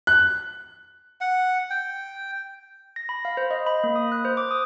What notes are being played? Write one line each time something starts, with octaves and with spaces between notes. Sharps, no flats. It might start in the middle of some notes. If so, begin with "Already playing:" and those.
F#6
F#5
G5
A#6
B5
F5
C5
D#5
B5
A#3
D#6
F#6
C5
D6
D#6